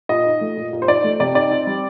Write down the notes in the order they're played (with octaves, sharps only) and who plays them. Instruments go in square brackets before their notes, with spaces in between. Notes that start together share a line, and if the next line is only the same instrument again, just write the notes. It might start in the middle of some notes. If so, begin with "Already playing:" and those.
[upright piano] A#2 D#5
D#4
A3
A#2
A#2
C5
D#4 D5
A3
C3 D5
D#4 D5
C4
G3